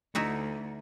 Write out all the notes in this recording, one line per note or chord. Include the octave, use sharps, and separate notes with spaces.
D2 D#4 E4 F#4